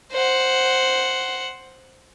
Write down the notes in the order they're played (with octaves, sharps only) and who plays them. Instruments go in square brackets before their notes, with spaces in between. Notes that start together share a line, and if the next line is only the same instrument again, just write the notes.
[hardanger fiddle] C5 F#5